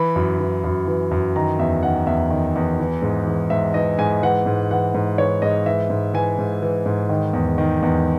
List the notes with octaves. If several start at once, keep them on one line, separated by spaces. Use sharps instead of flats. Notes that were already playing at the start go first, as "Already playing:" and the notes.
Already playing: E3 B5
F#2
E3
F#2
E3
F#2
D#3 A#5
E2 E5
D#3 F#5
E2 E5
D#3
E2
E3
G#2
E3
G#2 E5
E3 D#5
G#2 G#5
E3 F#5
G#2
E3 F#5
G#2
E3 C#5
G#2 D#5
E3 E5
G#2
E3 G#5
G#2
E3
G#2
D#3
E2
D#3
E2